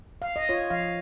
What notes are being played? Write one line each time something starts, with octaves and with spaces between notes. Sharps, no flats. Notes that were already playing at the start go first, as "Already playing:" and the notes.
F5
D#5
F4 C#5
F3 F5